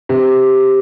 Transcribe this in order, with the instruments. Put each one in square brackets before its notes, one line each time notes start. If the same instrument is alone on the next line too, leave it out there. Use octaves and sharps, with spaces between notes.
[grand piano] C3